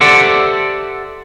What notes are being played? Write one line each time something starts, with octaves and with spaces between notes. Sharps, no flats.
G4 A4 C5 D5 E5 F#5